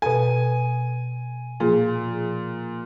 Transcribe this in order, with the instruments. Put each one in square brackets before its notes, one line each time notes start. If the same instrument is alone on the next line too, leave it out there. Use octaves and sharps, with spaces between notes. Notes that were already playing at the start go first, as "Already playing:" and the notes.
[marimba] B2 A4 [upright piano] G#5
[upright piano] A#2 [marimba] F3 G#4